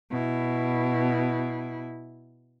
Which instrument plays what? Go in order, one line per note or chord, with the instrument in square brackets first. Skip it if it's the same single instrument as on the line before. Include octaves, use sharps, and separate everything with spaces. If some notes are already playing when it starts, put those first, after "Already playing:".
[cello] B2 E4